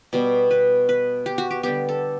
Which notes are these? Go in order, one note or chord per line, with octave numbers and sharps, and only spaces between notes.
B2 G3 B3
B4
B4
G4
F#4
G4
D3 G3 B3 G4
A4